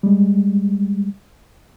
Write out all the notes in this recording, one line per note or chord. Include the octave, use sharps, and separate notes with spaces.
G3 G#3